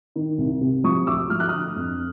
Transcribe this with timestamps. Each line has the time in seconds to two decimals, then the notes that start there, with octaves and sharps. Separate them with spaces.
0.16 D#3
0.38 C2
0.61 C3
0.84 F3 C#6 D#6
1.07 D2 D6 E6
1.30 F3 F6
1.40 F#6
1.49 D3 D#6 F6
1.76 F2